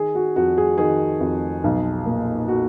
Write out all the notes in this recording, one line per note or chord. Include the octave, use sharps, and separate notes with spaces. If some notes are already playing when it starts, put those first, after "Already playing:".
Already playing: D#3 G#4
F#4
F2 F#4
G#4
D#3 G#4
F2
B1
A#2
F#4